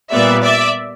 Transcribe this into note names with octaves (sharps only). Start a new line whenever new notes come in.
A#2 G3 B3 D5 E5
D5 E5